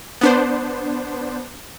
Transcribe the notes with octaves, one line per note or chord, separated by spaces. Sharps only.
B3 D4 C5